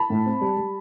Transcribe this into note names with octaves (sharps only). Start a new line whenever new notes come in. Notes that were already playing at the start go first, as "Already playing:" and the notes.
Already playing: A5 B5
A2
C4
G3
G3